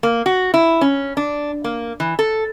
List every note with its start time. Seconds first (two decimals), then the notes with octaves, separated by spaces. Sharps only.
0.03 A#3
0.26 F#4
0.54 E4
0.81 C#4
1.17 D4
1.64 A#3
2.00 E3
2.19 A4